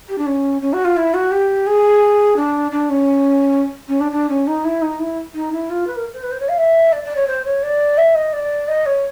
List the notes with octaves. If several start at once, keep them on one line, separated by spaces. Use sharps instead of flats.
G4
D4
C#4
C#4
F#4
F4
E4
F#4
G4
G#4
D4
D4
C#4
C#4
D4
D4
C#4
D#4
E4
D#4
E4
D#4
E4
F4
B4
A#4
C5
B4
C5
C#5
F5
E5
D5
D5
C#5
C5
C#5
D5
E5
D#5
D5
D#5
C#5